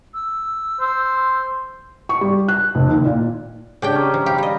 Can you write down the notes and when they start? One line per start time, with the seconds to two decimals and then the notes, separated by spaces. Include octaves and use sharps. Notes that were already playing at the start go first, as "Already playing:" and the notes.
0.14 E6
0.81 C5
2.09 C#6
2.21 G3
2.48 F#6
2.75 F1
2.89 D#2
3.05 A#2
3.82 C#3 D4 G4 G5
3.95 C#4 D#4
4.14 F3
4.26 G4 F5 B5
4.38 G3 D#5